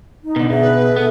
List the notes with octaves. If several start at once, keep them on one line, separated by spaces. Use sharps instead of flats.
D#4
B2 D3
B2 G#4 D5 E5
B4
E5
B3 A4